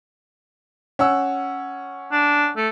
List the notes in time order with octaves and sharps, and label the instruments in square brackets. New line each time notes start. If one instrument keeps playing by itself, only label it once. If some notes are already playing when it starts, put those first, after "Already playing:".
[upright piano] C#4 F#5 E6
[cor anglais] D4
A3